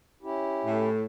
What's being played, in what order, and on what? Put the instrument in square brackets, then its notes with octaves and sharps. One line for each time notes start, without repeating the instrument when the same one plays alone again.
[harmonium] C#4 E4 G4
[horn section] A2 A3